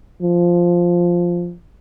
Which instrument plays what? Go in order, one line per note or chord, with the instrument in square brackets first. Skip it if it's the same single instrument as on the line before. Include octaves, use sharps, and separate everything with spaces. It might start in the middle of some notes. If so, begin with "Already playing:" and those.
[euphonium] F3